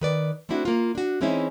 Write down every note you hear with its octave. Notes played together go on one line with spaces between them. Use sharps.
D#3 B4 D5
A3 C4 D4 E4 F#4
A#3 F4
D4 F#4
E3 G#3 C4 C#4 D#4 E4